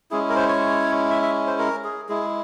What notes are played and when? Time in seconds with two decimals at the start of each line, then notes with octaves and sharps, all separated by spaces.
0.11 G#3 C#4 E4 G#4
0.30 A#4
0.36 C5
0.48 C#5
1.10 E5
1.22 E5
1.47 C5
1.59 A#4
1.84 G#4
2.09 G#3 E4 G#4